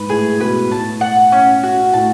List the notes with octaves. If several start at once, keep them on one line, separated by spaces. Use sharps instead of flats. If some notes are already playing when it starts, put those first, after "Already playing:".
Already playing: G#2 B4
A2 G#4
B2 B4
A2 A5
F#5
C#4
F#4
A2 A5